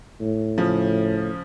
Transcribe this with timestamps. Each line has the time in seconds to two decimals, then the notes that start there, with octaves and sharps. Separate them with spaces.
0.21 A2
0.58 C#3 F3